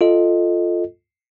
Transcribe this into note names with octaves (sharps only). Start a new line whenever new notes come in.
F4 A4 D#5